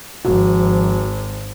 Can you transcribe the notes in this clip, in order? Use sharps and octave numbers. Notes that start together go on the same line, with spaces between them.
G#1 F3 F#4